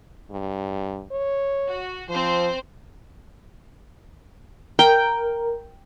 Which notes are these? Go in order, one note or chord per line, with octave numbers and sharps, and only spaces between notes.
G2
C#5
F#4
F3 C4 C5
A#4 G5